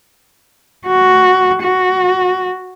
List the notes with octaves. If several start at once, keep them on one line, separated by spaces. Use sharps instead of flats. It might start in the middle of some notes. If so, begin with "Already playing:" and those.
F#4
F#4